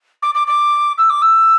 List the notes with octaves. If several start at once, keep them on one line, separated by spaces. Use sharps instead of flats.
D6
D6
D6
E6
D6
E6